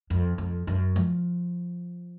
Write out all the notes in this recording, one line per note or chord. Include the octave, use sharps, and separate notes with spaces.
F2
F2
F#2
F3